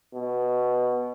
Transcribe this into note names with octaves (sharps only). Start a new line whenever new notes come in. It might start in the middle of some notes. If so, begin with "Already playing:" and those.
B2